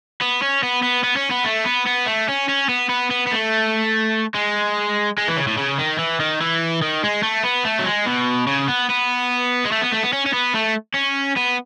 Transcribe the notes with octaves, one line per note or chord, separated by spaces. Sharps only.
B3
C#4
B3
B3
B3
C#4
B3
A3
B3
B3
A3
C#4
C#4
B3
B3
B3
B3
A3
G#3
G#3
E3
C#3
A2
C#3
D#3
E3
D#3
E3
D#3
G#3
A3
B3
A3
F#3
G#3
B2
C#3
B3
B3
G#3
A3
B3
A3
B3
C#4
C#4
B3
A3
C#4
B3